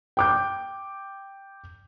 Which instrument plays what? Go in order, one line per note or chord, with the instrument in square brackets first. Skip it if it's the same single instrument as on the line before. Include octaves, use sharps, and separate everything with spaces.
[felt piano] G5 D6 G6